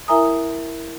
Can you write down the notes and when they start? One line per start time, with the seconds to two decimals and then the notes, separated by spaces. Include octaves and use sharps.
0.08 E4 A#4 E5 G#5 A#5 D#6